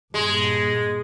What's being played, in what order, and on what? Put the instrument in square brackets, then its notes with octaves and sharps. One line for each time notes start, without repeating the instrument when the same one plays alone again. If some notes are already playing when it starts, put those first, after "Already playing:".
[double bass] G2 A#2 [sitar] G#3